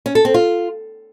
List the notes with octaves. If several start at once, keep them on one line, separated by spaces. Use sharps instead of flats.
C#4
A4
C4
F4